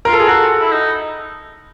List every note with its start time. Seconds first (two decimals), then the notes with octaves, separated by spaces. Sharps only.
0.05 F4 A#4
0.13 A4
0.20 G#4
0.27 F#4 A4
0.60 E4
0.72 D#4